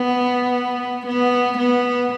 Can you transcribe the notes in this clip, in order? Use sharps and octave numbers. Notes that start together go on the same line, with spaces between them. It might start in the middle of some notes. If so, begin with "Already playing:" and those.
Already playing: B3
B3
B3